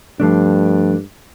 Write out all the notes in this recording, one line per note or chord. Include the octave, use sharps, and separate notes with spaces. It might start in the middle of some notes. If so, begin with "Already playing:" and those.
G2 F3 A3 D4